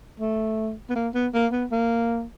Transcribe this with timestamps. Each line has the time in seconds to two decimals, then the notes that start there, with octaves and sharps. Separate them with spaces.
0.20 A3
0.90 B3
0.95 A#3
1.15 B3
1.34 A#3
1.52 B3
1.71 A#3